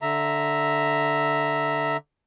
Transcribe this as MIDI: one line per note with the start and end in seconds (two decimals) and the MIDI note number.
0.02 1.97 50
0.02 1.97 76
0.02 1.97 82